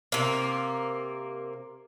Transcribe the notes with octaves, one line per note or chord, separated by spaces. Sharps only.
C3 A#3